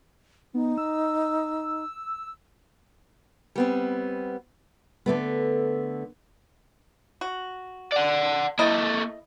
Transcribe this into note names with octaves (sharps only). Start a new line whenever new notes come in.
B3 D#4
E6
G3 B3 C4
D3 A3 B3
F#4
D5 F#5
A#3 E4 A4 D#5